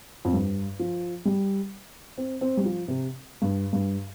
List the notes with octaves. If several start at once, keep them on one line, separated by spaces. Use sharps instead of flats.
F2
G2
F3
G3
C4
C4
G3
F3
C3
G2
G2